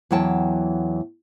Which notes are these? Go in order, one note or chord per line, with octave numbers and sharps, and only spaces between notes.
E2 E3 F#3 G5 A5